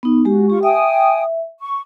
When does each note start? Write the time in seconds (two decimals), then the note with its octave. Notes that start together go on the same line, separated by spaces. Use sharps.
0.03 B3 D#4
0.25 G#3 F#4 G4
0.50 F4 G4 C#6
0.63 E5 G5 G#5 D#6
1.59 C#6